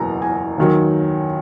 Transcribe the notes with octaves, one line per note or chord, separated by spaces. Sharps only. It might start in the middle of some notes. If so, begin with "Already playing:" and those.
Already playing: F#1 E2 B2 A#5
G#5
D#2 D#3 F#3